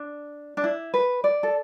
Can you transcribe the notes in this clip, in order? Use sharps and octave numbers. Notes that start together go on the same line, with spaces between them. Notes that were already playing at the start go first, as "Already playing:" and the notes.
Already playing: D4
D4
E4
B4
D5
A4